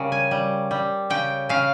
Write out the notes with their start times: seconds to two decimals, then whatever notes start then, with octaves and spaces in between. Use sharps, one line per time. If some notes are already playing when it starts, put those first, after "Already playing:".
Already playing: C#3 G3 A#4
0.12 G#5
0.31 G3
0.71 G3
1.10 C#3 G5
1.49 C#3 F5